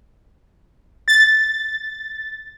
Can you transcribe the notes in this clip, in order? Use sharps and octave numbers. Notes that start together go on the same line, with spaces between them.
A6